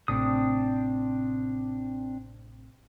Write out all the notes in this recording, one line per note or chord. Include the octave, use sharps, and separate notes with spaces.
A1 A2 C3 C4 D4 D#6